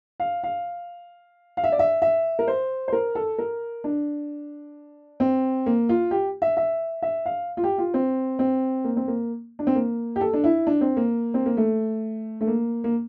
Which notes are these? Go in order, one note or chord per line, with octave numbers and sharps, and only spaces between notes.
F5
F5
F5
E5
D5
E5
E5
A#4
C5
C5
A#4
A4
A#4
D4
C4
A#3
F4
G4
E5
E5
E5
F5
F4
G4
F4
C4
C4
A#3
C4
A#3
D4
C4
A#3
G4
A4
D4
E4
D4
C4
A#3
C4
A#3
A3
A3
A#3
A#3